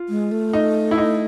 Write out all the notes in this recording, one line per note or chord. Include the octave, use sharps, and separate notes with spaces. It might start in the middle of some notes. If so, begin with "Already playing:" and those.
Already playing: F4
G#3
A3
D#4
E4
D#4